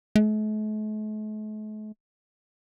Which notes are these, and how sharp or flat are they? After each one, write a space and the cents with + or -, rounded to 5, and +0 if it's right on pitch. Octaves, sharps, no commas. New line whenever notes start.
A3 -45